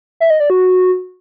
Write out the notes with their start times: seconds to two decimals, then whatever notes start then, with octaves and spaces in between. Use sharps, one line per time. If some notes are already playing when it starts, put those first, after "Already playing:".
0.20 E5
0.30 D#5
0.40 D5
0.50 F#4